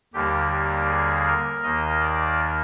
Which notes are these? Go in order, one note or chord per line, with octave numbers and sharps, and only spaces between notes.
D#2 D3 G3 A#3 G4
G4
G#4
A#4
D#2 D#3 A#3 D#5
D5